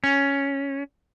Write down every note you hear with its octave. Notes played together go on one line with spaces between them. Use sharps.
C#4